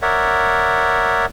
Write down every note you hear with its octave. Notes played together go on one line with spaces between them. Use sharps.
A#4 C#5 D5 E5 F#5